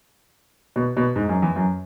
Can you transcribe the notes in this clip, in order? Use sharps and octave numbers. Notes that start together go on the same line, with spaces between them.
B2
B2
G#2
F#2
E2
F#2